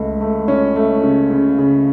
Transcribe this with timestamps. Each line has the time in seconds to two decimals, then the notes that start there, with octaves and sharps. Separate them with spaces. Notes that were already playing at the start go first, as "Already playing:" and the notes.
Already playing: C#2 C#3 A3
0.21 A3
0.48 C#4
0.76 A3
1.04 C#3
1.31 C#3
1.59 C#3